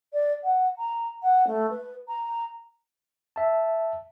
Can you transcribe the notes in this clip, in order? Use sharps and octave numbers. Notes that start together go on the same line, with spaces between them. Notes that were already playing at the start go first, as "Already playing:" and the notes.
D5
F#5
A#5
F#5
A3
B4
A#5
E5 A5